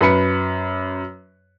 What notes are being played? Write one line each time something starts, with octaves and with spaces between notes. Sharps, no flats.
F#2 B4 B5 C#7